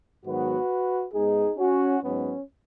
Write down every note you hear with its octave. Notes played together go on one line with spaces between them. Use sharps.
G#2 D#3 F#3 B3 F#4 B4
G#2 G#3 B3 D#4 G#4
C#4 F#4
G#2 F#3 B3 C#4